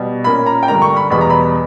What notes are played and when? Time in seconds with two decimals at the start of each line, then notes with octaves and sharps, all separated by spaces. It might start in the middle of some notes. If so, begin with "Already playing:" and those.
Already playing: B2 G3
0.24 A#2 A#3 C#4 B5
0.46 A#5
0.63 G5
0.68 G2 D3 A#3 D4 A#5
0.82 C#6
0.96 B5
1.10 E2 B2 G3 B3 B5
1.21 A#5
1.30 B5